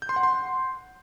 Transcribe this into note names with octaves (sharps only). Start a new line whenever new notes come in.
G6
C6
F#5
C6